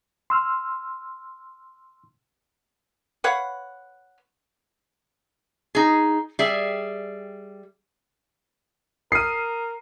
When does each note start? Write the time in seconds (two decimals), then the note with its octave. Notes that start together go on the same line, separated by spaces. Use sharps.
0.30 C6 E6 F6
3.24 B4 C#5 F5 F#5
5.75 D#4 G#4
6.39 G3 G#4 E5
9.12 A#4 D#6 F6 C7 D#7